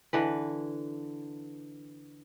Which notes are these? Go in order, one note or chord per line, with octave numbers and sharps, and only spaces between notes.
D3 E3 B4